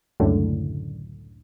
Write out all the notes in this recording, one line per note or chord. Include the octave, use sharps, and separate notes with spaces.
C#2 F#2 A2 D3